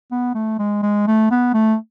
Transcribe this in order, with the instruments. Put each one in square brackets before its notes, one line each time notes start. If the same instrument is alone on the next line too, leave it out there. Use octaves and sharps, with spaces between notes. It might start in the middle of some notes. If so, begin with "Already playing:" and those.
[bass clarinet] B3
A3
G#3
G#3
A3
B3
A3